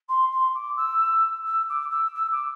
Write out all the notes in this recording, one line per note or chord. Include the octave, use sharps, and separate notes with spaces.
C6
C6
D6
E6
E6
D6
E6
E6
D6